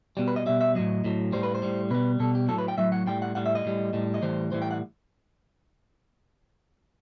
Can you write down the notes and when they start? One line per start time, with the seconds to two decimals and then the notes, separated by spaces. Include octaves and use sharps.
0.17 B2 G3
0.28 B4
0.36 D#5
0.46 B2 G3 E5
0.61 E5
0.75 A2 F#3 D#5
1.04 A2 F#3
1.32 A2 G3 C5
1.43 B4
1.55 C5
1.62 A2 G3
1.90 B2 G3 B4
2.20 B2 G3 A4
2.35 G4
2.48 A2 F#3 A4
2.58 B4
2.68 G5
2.78 A2 F#3 E5
2.92 F#5
3.07 A2 G3 G5
3.22 F#5
3.35 A2 G3 F#5
3.46 E5
3.55 D#5
3.65 A2 G3
3.93 A2 G3
4.14 D#5
4.22 A2 E3 G3 C5
4.52 A2 E3 G3 C5
4.62 G5
4.71 F#5